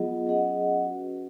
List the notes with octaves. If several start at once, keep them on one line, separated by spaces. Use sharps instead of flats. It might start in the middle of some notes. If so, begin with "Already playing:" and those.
Already playing: F#3 B3 F4 G#4 D#5
F#3 C#4 G#4 D#5 F#5
C#4 F#4 B4